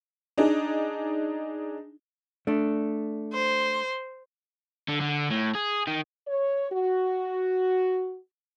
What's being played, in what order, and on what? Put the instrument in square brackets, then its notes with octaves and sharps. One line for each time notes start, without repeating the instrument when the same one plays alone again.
[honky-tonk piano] D4 D#4 G#4
[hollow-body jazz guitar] A3 D4
[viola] C5
[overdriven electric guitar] D3
D3
A2
G#4
D#3
[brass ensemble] C#5
F#4